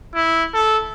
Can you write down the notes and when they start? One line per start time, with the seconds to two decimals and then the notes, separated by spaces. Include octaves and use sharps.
0.15 E4
0.54 A4